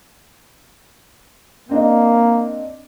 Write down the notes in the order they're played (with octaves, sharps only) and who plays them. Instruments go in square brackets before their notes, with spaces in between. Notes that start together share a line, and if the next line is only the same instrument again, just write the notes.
[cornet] A#3 [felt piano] C4 D4 D#5